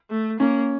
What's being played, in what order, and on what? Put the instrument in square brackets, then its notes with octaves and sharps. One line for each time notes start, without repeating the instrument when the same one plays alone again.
[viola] A3
[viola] A#3 [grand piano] C#4